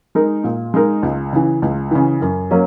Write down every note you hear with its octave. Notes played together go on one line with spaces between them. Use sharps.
G#3 D#4 A#4
A#2
G#3 D#4 A#4
C#2
C#3 E3
C#2
C#3 E3
F#2
F#3 A#3 C#4